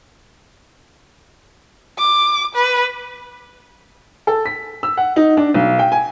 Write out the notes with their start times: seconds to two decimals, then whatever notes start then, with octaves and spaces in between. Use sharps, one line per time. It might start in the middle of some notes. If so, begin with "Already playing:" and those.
1.98 D6
2.55 B4
4.27 A4
4.46 B6
4.83 E6
4.97 F#5
5.16 D#4
5.37 D4
5.54 B1
5.79 G5
5.92 G#5